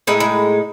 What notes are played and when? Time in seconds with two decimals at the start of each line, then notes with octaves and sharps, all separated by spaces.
0.07 A2 G#3 D#4 E4
0.20 E4